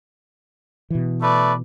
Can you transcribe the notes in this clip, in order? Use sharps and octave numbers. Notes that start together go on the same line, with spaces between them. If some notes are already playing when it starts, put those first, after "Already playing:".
B2 E3
A3 B4 D5